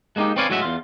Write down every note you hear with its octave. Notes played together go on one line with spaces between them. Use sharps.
G#3 A#3 C#4 D#4 G4
C4 B4 C#5 D5 F5 G#5
A2 F#3 G#3 F#4 A#4 E5
E2 F4